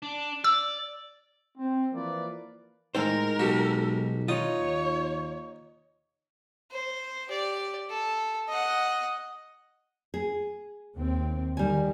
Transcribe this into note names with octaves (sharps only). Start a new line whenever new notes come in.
D4
D5 E6
C4
E3 F3 A#3 B4 D5
A2 G#3 D#4 A#4 C5 G5
B1 F#4 G4 A4
D#4 F4 C#5 D#6
D#2
C5
G4 D5
A4
D#5 F#5
G#4
D#2 C4
D#3 G3 G#5